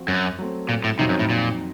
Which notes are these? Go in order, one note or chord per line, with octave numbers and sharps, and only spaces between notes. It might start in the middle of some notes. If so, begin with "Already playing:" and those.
Already playing: F3 C4 F#4
F#2
F#3 A3 C4
A#2
A2
F2 C3 D#3 F#3 C4 D#4
F#2
A2
A#2